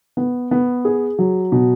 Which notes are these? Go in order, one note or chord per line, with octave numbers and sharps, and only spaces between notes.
B3
B3
G#4
F#3
B2